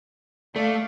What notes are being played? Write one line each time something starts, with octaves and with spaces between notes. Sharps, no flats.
A3 D5 F5